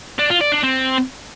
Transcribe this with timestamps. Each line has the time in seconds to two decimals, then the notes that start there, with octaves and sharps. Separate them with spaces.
0.19 D4
0.30 F4
0.41 D5
0.52 D4
0.63 C4